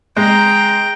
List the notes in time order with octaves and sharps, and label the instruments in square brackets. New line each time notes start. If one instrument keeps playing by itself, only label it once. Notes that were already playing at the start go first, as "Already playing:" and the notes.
[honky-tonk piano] G#3 [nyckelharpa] G5 A#5